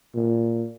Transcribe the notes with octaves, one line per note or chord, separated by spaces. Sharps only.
A#2